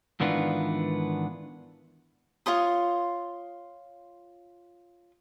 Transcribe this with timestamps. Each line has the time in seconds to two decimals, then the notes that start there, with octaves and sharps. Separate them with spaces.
0.20 G#2 D#3 E3 B3 D4 F4
2.46 F4 C#5 C6 D#6